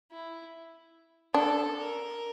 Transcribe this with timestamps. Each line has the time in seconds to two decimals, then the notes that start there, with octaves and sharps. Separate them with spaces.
0.11 E4
1.34 D4 A4
1.80 A#4